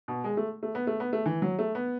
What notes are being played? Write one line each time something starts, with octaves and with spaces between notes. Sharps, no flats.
B2
G#3
A3
A3
B3
A3
B3
A3
E3
F#3
A3
B3